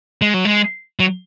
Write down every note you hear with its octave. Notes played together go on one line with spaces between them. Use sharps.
G#3
F#3
G#3
F#3